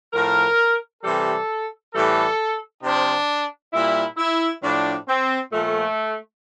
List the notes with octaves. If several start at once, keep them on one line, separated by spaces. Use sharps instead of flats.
A2 F3 A#4
C3 E3 G3 A4
A2 E3 G3 A4
C3 F3 D4
A#2 G3 E4
E4
A2 F3 D4
C4
A#2 F3 A3